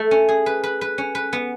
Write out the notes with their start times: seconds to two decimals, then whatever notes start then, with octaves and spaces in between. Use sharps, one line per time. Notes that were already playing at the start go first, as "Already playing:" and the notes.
Already playing: A3
0.11 C#4
0.29 G#4
0.46 B4
0.64 B4
0.81 B4
0.98 C#4
1.15 B4
1.33 B3